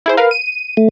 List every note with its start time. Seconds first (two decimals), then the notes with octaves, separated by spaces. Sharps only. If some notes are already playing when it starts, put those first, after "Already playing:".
0.06 E4 G#4 C5
0.17 A#4 B4 F5
0.31 D#7
0.77 A3